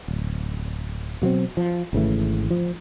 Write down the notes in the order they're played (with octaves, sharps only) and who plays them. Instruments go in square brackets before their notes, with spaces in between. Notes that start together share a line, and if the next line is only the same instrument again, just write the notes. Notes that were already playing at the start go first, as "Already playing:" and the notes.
[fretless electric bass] D1
B2 F#3 A3 C4
F3
G#1 C#3 E3 A3
F3